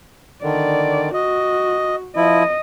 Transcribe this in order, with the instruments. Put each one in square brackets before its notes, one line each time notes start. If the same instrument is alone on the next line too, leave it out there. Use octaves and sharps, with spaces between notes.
[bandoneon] D3 D#3 [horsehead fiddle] D5
[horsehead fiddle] F#4 [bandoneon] D#5
[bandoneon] F3 E4 [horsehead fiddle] D#5